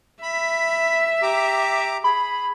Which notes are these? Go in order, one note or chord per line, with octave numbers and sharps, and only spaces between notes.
E5 B5
G4 A#5 D6
G#4 B5